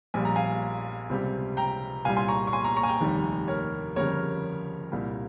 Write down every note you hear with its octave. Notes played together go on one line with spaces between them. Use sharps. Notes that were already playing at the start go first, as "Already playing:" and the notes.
A#1 A#2 G3 G#5
A#5
F5 G#5
C#2 C3 G3
G5 A#5
C2 A#2 G3 F5 G#5
G#5 C6
A#5 C#6
C#6
G#5 C6
A#5 C#6
A#5 C#6
G#5
G5 A#5
F1 D#2 D#3 G3
A#4 C#5
G1 F2 C#3 G3 A#4 C#5
C2 A#2 G3